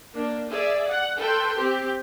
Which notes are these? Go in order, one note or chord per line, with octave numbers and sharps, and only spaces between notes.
A#3 D4
G#4 D5 E5
F#5
A4 B4 G5 C6
C4 G4